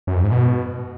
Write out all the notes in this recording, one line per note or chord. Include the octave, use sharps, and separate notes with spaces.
F#2
F2
G#2
B2